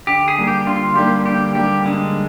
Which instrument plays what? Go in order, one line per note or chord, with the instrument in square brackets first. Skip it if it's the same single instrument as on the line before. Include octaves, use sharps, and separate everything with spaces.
[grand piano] D3 [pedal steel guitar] G4
[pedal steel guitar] G#4
[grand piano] G3 A#3 D4
[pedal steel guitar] G4
[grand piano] D3 [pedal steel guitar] F4
[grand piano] G3 A#3 D4 [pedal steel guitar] G4
[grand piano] D3 [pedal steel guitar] G4
[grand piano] G3 A#3 D4 [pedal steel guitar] G4
[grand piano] D3 [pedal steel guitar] G#3